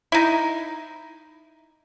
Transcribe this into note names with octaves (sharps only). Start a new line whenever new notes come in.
D#4 E4